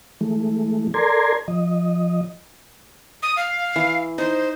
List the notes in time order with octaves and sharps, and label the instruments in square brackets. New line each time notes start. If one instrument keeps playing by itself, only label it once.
[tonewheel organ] E3 G#3 A3
A4 A#4 D5 A#5 C6 G#6
F3 D#5
[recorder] D#6
F5
[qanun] E3
[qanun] D#4 [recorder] C5